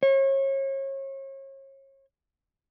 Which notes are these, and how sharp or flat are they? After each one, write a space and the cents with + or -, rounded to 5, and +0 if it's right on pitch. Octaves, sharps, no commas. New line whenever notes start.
C#5 -35